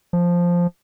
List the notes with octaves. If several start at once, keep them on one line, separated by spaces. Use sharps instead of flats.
F3